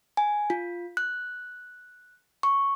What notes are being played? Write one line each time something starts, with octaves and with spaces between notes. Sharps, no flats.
G#5
F4
F#6
C#6